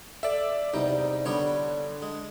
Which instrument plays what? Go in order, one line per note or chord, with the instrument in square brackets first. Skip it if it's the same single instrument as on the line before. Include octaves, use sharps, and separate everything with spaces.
[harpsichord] A4 [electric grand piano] D5 E5
[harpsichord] E2 C3 G3 [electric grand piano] D#4
[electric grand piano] D3 [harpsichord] G3 B3 C#5
[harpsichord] G#3